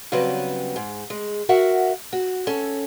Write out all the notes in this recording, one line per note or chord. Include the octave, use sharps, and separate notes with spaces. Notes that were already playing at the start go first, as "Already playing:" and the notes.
C#3 F#3 G3 B3 C4 B4
G#2
G#3
F#4 A#4 E5 F#5
F#4
C#4 A4